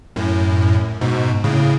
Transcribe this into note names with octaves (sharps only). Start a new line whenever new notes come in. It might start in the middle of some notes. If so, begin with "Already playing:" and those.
F#2 A2
G#2 B2
A2 C#3